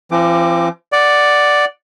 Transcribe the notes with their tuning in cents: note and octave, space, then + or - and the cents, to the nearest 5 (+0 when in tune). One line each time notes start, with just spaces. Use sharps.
F3 -40 C4 +20 D6 +10
D5 +0 F#5 +0